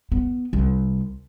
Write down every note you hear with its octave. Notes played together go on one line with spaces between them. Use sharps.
B3
C2